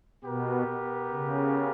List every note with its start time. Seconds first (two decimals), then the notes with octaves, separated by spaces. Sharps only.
0.24 B2 B3 G4 A#4
1.11 C#3